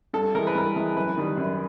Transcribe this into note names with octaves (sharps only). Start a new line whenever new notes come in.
G2 A4
E3 G#3 A#4
B4
G2 A#4
E3 G#3
F#2 B4
D#3 G3
F#2